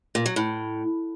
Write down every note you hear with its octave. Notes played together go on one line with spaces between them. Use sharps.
A#2
F#3
A2